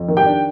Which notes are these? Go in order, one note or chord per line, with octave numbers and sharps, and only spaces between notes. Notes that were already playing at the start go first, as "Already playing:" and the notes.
Already playing: F2
D#3
G4 G5
D4